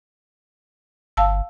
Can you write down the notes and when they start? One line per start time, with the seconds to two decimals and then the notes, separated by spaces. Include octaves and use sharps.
1.17 G1 F5 A5 E6